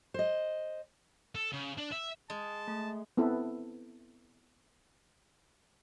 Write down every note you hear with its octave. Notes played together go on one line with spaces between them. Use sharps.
C5 D#5
A4
C#3
D4
E5
G#3 A5
A3
B3 C4 E4 A4 B4